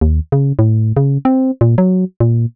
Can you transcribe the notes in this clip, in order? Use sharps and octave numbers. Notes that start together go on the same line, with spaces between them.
D#2
C#3
A2
C#3
C4
A#2
F#3
A#2